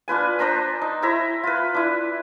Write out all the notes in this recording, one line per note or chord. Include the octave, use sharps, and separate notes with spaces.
D4 F4 B4 G#5
D4 C5 A#5 E6
D#4
E4 C5 E5 A#5
F4 B4
D4 E4